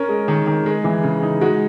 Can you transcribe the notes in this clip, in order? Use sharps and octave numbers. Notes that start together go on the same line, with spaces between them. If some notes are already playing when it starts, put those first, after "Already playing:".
Already playing: C#4 A#4
G#3
D#3
D#3
G#3 G#4
E3
C#3
D#4
G#3 F#4